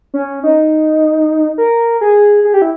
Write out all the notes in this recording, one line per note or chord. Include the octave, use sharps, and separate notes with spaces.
C#4
D#4
A#4
G#4
G#4
G4
E4